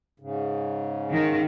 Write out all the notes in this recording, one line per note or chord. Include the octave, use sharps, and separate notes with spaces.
G#2 C#3
D#3